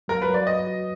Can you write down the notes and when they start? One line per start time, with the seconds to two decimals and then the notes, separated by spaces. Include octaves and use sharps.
0.08 F#3 A#4
0.22 B4
0.28 F#3
0.34 D5
0.47 B4 D#5
0.67 F#4